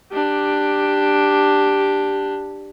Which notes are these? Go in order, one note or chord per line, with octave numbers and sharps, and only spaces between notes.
D4 G4